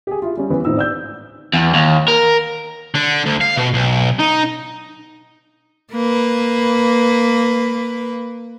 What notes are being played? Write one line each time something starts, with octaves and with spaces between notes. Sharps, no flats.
G4 G#4
E4 F4
G3 C#4
E3 B3 C#4
G#1 A2 D#4 E6
D5 E6 G6
E2
D#2
A#4
D3
D2
F5
B2
B1
D#4
A#3 B4